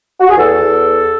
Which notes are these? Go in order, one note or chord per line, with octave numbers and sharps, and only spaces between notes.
F#4
G#4
E2 A4
E2